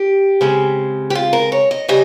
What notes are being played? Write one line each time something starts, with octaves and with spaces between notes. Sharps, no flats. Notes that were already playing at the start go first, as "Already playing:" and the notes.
Already playing: G4
C#3 G#3 C4
G4
F4
A#4
C#5
D#5
C#3 G3 D#5